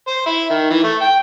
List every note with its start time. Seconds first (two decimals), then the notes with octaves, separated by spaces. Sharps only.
0.08 C5
0.26 E4
0.50 D#3
0.70 E3
0.84 A3
1.01 G5